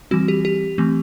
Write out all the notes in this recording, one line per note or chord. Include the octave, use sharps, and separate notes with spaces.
E3 G3 C4 F#4
G4
G4
E3 A3 C4